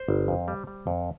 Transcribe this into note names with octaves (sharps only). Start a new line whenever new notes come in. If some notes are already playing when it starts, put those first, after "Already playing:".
Already playing: C5
G1
F2
G3
G3
F2